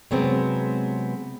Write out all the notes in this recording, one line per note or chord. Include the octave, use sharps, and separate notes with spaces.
C3 F#3 G#3 B3 C4